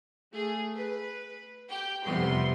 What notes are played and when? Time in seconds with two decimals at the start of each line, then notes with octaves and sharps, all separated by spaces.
0.32 A3 G#4
0.75 B4
1.69 G4 G5
2.04 F2 C3 G3 B3 C6